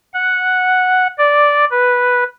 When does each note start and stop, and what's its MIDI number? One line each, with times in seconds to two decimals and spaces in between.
0.14 1.07 78
1.18 1.65 74
1.71 2.24 71